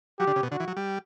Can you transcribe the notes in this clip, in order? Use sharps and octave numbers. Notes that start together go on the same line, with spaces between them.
F#3 G4
D3
C#3
B2
D3 F#4
E3
F#3
G3